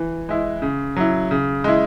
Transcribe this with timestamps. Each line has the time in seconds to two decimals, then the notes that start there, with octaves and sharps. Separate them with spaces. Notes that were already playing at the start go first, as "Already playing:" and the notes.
Already playing: E3
0.29 G#3 E4
0.62 C#3
0.96 F#3 E4
1.31 C#3
1.64 G#3 E4